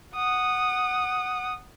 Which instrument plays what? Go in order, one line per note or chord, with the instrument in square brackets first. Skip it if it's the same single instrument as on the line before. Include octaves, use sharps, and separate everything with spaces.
[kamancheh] F#5 D#6